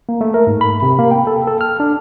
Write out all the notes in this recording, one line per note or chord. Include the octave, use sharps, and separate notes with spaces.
A#3
A3
A#4
G#2
B5
C3
A#3
G5
A4
A4
F6
D4